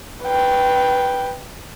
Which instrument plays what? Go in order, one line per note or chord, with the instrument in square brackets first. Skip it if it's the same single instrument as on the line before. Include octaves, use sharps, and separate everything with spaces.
[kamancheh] B4 G5